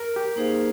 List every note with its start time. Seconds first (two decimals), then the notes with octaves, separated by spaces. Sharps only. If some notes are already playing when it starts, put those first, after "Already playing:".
Already playing: A#4
0.16 G4
0.36 A#3 D#4 G#4 C5 F5